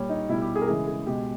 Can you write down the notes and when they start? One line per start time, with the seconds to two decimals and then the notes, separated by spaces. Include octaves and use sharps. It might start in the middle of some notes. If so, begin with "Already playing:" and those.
Already playing: A#2 G3 C#5
0.09 D#4
0.29 B2 G3 E4
0.42 G4
0.56 G#4
0.62 A#4
0.67 C#3 E3 G#3 G#4
0.87 G#4
1.07 B2 G#3 G4